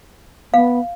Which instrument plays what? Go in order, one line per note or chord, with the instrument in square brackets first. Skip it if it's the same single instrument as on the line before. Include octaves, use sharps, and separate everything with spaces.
[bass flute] B3 [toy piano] F5